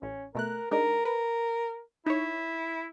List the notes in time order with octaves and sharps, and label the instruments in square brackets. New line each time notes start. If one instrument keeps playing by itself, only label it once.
[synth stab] A1 [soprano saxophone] C#4
[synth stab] B2 A3 F#6 [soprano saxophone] A#4
[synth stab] G#3 D4 D#4 [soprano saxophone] A#4
[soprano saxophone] A#4 [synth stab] B4
[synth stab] D#4 C#5 [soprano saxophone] E4